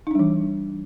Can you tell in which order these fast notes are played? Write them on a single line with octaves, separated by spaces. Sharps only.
D#4 D4 G3 E3